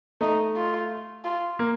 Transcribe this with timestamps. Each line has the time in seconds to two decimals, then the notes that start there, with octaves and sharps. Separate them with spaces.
0.21 A3 D#4
0.56 F4
1.24 F4
1.59 A#3